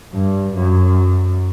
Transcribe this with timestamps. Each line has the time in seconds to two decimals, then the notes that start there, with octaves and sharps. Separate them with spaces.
0.13 G2
0.55 F#2